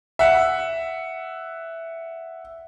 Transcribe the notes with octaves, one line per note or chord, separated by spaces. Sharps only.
E5 F#5